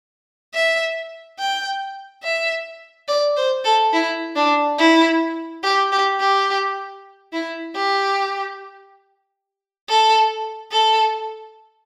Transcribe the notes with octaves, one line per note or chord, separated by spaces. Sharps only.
E5
G5
E5
D5
C5
A4
E4
D4
E4
G4
G4
G4
E4
G4
A4
A4